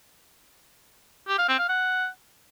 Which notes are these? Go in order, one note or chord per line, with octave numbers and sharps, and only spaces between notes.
G4
F5
C4
F5
F#5